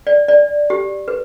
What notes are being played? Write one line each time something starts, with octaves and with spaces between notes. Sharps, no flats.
D5
D5
G4
B4